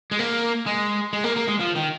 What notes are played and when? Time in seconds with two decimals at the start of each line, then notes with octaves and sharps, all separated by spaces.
0.11 G#3
0.19 A#3
0.66 G#3
1.13 G#3
1.24 A#3
1.36 A#3
1.47 G#3
1.59 F3
1.75 D#3